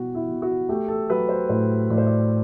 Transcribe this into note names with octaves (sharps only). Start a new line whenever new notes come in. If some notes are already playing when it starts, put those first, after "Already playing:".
Already playing: B2 G3 E4 F#4 G4
E4
B2
F#4
A3 G4
A4
F#3 B4
C5
A2 C5
A2 D5
C5
D5